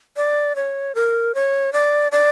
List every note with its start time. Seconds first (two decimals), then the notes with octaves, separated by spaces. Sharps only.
0.17 D5
0.56 C#5
0.95 A#4
1.35 C#5
1.73 D5
2.12 D5